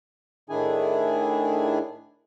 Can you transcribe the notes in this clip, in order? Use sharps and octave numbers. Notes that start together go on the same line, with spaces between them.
A2 D#3 D4 E4 G#4 G#5